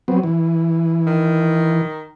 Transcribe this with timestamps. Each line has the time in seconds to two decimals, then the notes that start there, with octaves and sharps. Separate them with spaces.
0.08 F#3 B3 C4
0.23 E3
1.07 D#3